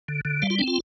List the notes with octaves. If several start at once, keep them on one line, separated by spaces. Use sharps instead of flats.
D3
D3
G3 F5
F4
C4 D4
F4